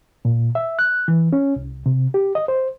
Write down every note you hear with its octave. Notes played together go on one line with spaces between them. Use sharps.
A#2
E5
F#6
E3
C#4
C2
C3
G4
D#5
C5